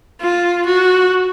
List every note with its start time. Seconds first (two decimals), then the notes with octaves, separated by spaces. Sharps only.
0.21 F4
0.66 F#4